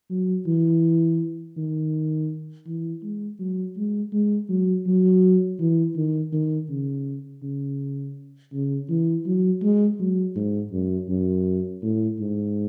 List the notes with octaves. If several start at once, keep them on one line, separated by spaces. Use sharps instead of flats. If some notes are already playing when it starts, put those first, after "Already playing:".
F#3
E3
D#3
E3
G#3
F#3
G#3
G#3
F#3
F#3
E3
D#3
D#3
C#3
C#3
C#3
E3
F#3
G#3
F#3
G#2
F#2
F#2
A2
G#2